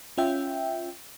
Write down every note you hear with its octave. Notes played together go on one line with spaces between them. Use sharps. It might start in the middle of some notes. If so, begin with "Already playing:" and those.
C#4 F4 E5 G5